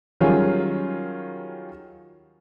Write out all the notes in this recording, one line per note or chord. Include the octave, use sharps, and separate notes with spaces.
D#3 F#3 G3 C#4 F4 G#4